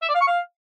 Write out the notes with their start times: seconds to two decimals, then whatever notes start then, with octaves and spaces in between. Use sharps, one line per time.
0.02 E5
0.09 D5
0.15 F5
0.21 C#6
0.27 F5